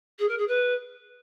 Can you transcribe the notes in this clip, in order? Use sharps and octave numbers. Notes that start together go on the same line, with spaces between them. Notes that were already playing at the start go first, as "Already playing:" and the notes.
G#4
A#4
G#4
B4